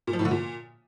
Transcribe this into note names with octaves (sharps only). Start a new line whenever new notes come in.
A#2
F3
A2
D3
A#2